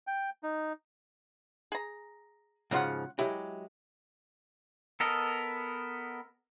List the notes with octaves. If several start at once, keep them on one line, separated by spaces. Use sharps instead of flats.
G5
D#4
G#4 A#5
G#2 C#3 F3 F#3 F4 F#5
F#3 G#3 E4 G4
B3 A4 A#4 D#5